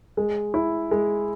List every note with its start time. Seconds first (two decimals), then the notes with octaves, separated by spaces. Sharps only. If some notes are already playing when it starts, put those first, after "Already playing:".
0.17 G#3
0.54 E4
0.91 G#3